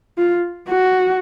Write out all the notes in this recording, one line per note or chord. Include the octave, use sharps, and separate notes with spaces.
F4
F#4